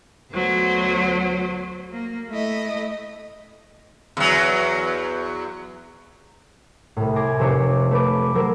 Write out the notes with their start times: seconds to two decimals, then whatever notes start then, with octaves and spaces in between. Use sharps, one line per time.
0.33 D2 F#3 B3 C5
1.92 A#3
2.31 A3 E4 D#5
4.17 E2 F#3
6.96 C2 A2
7.16 G#5 C6 D6 A#6
7.39 F1 C3 C5 C#5 D6
7.91 A3 B4 D6
8.35 F#3 A3 A#4 C5 E6